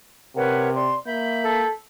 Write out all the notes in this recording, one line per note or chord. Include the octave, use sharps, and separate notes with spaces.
C3 A#4 B4 C#5 F#5
D5 C6
A#3 E5 B5 G6
A4